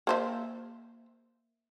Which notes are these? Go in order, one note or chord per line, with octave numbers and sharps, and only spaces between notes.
A#3 C5 E5